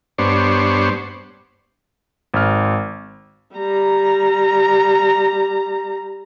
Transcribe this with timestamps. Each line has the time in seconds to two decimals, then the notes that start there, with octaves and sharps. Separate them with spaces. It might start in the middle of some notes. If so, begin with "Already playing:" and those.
0.18 G2 B3 D4 C5 C#5
2.34 G#1 F6
3.54 G3 A#5